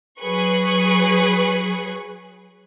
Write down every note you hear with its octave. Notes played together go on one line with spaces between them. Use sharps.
F#3 G#4 B4 C#6